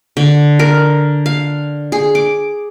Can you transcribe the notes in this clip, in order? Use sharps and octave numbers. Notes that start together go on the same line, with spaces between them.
D3
A#4
F5
G#4
D6